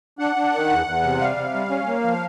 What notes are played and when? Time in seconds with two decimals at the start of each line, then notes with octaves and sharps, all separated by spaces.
0.19 D4 F#5
0.36 D4
0.53 D#3
0.70 E2
0.86 E2
1.03 C3
1.20 G3 F5
1.37 C3
1.54 G3
1.70 C#4
1.87 A#3
2.03 F3